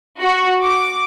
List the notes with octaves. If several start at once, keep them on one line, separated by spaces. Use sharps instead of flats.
F#4
D6